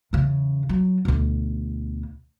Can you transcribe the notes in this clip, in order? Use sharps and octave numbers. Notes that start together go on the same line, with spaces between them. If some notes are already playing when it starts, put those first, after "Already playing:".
E2 C#3
F#3
D2 B2